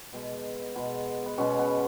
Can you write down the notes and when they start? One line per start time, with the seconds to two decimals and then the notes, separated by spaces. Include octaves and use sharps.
0.13 B2 G#3 B3
0.75 B2 G#3 B3
1.26 B3
1.38 B2 G#3 B3 C#4
1.59 B3